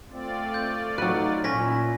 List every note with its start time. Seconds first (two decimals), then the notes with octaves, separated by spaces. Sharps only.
0.11 A3 C4 F4 D5
0.54 G6
0.98 F#3 D#4 B4 F#6
1.44 A#2 C#4 E4 G#5 A#6 B6